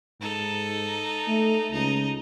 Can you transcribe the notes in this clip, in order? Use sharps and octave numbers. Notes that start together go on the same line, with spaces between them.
G#2 D#4 A4
A3
C#2 D#4